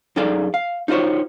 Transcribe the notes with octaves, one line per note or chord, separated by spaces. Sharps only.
F#2 D#4 G#4 A4 D5 F5
F5
D#4 F4 F#4 C5 C#5